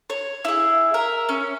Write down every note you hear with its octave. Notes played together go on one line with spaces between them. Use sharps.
C#5
E4 G#4
A#4 E5
C#4